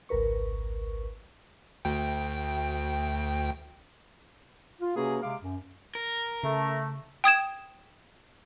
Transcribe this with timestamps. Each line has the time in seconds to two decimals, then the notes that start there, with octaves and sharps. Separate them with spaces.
0.09 G#1 C#2 A#4 B4 C#6
1.85 D2 G5
4.81 F4
4.96 C3 A#3 C#4 F#4 G#4 B4
5.23 C3 G#3 F5 D6
5.43 F#2
5.95 A#4
6.43 C#3 A3
7.24 G5 D#6 G#6 E7